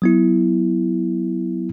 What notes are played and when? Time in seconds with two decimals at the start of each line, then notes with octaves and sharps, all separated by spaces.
0.02 F#3 B3 E4